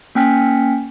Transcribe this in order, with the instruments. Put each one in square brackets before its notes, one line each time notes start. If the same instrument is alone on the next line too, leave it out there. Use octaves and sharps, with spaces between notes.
[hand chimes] A#3 C#4 G5 G#5 F6 B6